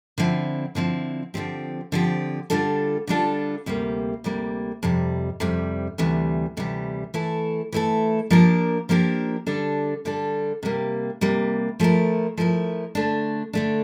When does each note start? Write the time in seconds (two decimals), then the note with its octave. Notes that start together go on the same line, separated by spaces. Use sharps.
0.18 D3 F3 C4 E4
0.75 D3 F3 C4 E4
1.34 D3 F3 C4 G4
1.92 D3 F3 C4 G4
2.50 D3 G3 D4 F4 A4
3.07 D3 G3 D4 F4 A4
3.66 D2 C3 G3 A#3
4.24 D2 C3 G3 A#3
4.83 F2 C3 G3
5.40 F2 C3 G3
5.98 D2 C3 E3 G3
6.57 D2 C3 E3 G3
7.14 E3 A3 E4 A4
7.72 E3 A3 E4 A4
8.30 F3 A#3 D4 G4 A#4
8.89 F3 A#3 D4 G4 A#4
9.47 D3 G3 D4 A4
10.05 D3 G3 D4 A4
10.63 C3 G3 A#3
11.21 C3 G3 A#3
11.80 F3 A3 E4 A#4
12.38 F3 A3 E4 A#4
12.95 D3 A3 D4
13.53 D3 A3 D4